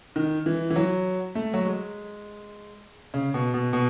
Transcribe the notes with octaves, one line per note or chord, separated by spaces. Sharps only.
D#3
E3
E3
F#3
A3
F#3
G#3
C#3
B2
B2
B2